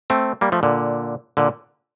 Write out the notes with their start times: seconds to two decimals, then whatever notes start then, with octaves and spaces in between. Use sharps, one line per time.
0.10 A3 C4
0.41 G3 A#3
0.52 F3 A3
0.63 A#2 D3
1.37 A#2 D3